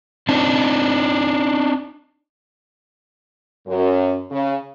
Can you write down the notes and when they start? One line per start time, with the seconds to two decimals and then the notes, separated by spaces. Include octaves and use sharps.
0.29 C4 D4 D#4
3.67 F#2
4.31 C#3